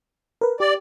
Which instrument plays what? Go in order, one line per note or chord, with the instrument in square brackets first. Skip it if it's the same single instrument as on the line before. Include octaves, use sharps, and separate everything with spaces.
[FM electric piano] A#4 B4
[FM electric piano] G4 [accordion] D5